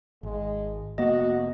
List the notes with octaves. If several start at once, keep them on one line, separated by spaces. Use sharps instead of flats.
G#1 G#3
F1 A#3 B3 F#4 D#5